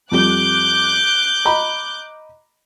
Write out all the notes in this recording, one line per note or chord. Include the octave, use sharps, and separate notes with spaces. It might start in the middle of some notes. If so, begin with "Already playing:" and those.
F2 G3 D6 F#6 G6
D#5 A#5 B5